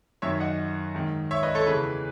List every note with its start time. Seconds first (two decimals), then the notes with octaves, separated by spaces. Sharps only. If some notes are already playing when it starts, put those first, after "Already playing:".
0.22 F#2 D#3 C#5 E5
0.40 D#5 F#5
0.95 G#2 D#3
1.31 C#5 E5
1.43 B4 D#5
1.55 A4 C#5
1.67 E2 C#3 E3 G#4 B4